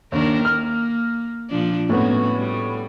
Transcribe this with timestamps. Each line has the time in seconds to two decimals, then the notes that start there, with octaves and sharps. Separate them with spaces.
0.12 D#2 D#3 D4 A#4
0.45 A#3 F6
1.50 A#2 F3 D4
1.89 A2 A#3 B3 C#4 F#4
2.35 G3